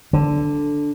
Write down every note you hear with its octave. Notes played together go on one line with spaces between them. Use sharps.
D3